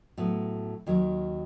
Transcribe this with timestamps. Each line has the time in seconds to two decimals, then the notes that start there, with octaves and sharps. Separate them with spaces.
0.18 A2 F#3 B3
0.87 D#2 D#3 F#3